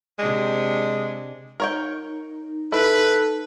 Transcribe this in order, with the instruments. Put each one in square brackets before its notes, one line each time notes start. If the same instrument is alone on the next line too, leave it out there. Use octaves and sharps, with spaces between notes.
[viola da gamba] C3 D4 [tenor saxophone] G#3
[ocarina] D#4 [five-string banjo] A#4 C#5 G5
[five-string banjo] E4 [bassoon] A4 [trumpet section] B4